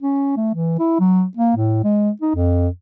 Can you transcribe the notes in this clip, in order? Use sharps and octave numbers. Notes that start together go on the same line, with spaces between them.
C#4
A3
E3
E4
F#3
A#3
A2
G#3
D#4
F2